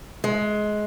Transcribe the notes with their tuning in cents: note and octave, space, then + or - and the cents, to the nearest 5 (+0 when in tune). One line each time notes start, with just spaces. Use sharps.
G#3 +20